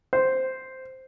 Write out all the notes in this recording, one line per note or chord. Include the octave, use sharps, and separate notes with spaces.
C5